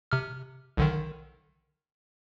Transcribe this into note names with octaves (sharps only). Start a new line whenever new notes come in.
C3 F6
B1 D3 D#3